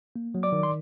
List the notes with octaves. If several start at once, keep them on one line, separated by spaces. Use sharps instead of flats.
A#3
F#3
D5 D6
D#3
C6